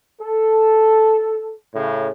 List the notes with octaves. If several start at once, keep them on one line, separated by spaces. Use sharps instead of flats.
A4
A2 C#3